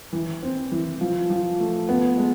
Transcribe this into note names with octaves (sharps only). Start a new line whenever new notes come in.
E3
C4
E3
F3
F3
A3
B3
G#3